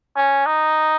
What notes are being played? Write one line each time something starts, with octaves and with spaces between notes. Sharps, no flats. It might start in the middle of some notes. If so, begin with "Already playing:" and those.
C#4
D#4